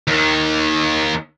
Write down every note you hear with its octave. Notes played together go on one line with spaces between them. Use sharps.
D#2 D#3